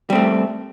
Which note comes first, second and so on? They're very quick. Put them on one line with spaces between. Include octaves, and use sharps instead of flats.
G3 C4 A3